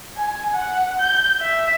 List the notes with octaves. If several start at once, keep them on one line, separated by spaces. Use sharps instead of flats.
G#5
F#5
G6
E5